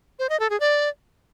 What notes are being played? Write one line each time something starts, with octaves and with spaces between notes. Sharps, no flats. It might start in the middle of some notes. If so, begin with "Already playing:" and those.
C5
D#5
A4
G#4
D5